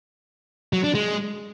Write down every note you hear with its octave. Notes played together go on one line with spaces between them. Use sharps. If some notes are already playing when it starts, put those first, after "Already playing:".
F#3
D4
G#3